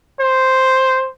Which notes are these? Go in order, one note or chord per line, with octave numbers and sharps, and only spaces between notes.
C5